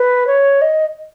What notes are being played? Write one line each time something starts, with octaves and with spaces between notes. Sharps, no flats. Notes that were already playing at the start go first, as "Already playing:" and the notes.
Already playing: B4
C#5
D#5